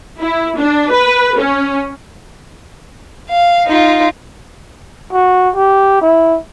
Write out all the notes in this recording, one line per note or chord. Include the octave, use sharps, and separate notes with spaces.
E4
D4
B4
C#4
F5
D#4 F4
F#4
G4
E4